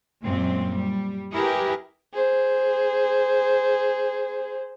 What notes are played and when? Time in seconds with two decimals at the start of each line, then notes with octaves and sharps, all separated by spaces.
0.23 F#2 A#2 G#3 C4
0.73 G3
1.32 E4 G4 G#4 A#4 B4
2.14 G#4 C5